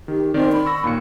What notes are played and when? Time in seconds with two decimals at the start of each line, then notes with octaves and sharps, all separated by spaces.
0.08 D#3 G4
0.34 D#3 C4 D5
0.52 B5
0.66 C#6 E6 A#6
0.84 D#2 A#2 C#7